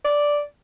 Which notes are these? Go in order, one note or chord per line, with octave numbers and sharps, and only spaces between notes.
D5